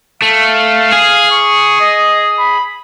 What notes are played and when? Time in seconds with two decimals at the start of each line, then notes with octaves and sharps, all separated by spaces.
0.22 A3 F5
0.92 G#4
1.31 C#6
1.80 D#5
2.39 B5